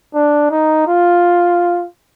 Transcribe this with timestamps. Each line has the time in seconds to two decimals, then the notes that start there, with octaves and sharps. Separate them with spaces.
0.15 D4
0.51 D#4
0.88 F4